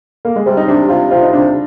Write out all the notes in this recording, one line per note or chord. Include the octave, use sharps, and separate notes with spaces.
A#3
G#3
C3 G3
D#4
C3 D4
C3 F4
C3 F4
D#4
C3 D4